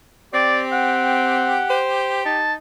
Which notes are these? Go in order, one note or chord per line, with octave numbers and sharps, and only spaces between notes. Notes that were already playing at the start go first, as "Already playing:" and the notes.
C4 G4 D5
F#5
C5
D#4 A5